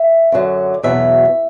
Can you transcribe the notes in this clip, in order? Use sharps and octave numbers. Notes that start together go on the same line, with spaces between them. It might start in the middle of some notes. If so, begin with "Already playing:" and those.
Already playing: E5
F#2 D3 F#3
E2 B2 F#3 E5